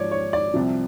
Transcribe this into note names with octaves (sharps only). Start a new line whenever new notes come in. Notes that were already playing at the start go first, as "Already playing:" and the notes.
Already playing: G#2 F3 C#5 D5
C#5
D5
C2 C3 F3